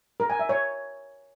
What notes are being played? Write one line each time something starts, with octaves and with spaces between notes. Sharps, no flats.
A#4
G#5
E5
C#5